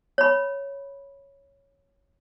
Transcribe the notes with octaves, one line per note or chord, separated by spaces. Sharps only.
C#5 B5